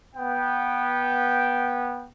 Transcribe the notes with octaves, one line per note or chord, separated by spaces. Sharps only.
B3 G5